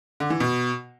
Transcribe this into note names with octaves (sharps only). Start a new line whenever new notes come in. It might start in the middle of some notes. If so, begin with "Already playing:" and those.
D3
E3
B2